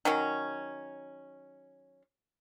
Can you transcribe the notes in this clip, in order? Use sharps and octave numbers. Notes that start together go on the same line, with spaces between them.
D#3 F#3 C#4